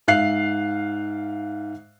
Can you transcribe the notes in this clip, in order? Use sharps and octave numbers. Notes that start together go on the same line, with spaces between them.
G#2 E5 F5 F#6 C7